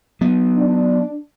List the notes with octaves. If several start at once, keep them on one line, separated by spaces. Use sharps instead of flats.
F#3 B3
D4